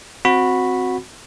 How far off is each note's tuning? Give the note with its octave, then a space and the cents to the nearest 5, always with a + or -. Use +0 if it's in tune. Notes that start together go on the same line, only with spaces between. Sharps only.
C4 +0 F#4 -15 B5 +0